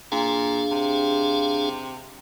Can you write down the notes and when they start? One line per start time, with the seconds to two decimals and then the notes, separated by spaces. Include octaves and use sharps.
0.12 A#2 D4 G#4 F5
0.71 C3